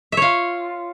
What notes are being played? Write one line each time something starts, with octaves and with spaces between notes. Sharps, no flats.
F4 C#5 E5